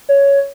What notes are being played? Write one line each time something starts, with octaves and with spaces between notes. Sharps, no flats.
C#5